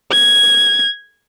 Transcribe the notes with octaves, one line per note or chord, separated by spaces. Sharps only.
G#6